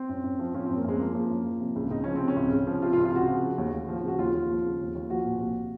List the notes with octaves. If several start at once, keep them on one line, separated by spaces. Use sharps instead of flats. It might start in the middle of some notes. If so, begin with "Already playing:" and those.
Already playing: C4
F#2
F#2
F3
F3 C#4
F#2 C4
A#3
F#2 G#3
C4
F3 A#3
F3
F#2
F3
C3
C#2
C#2 D#4
F3 C#4
C4
C3
C#4
C#2
C#2
F3
C3 F4
F4
C#2
F4
C#2 F#4
F3
C#3
D#2
D#2
F3
C#3 F#4
D#2 F4
D#2
F3
C#3
D#2
D#2
F3 F#4
A#2
C2